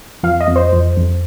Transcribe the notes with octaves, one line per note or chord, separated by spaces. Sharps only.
F2 F5
D#5
F2
C5
F2
F2